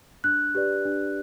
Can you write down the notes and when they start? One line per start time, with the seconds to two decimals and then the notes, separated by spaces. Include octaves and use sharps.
0.24 D4 F#6
0.55 G4 B4 D5
0.85 D4